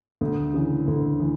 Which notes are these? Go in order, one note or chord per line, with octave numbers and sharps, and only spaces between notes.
D2
C#3 E3
D2
E3